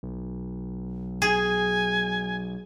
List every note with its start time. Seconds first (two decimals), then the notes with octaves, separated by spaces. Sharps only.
0.03 B1
1.22 G#4 G#5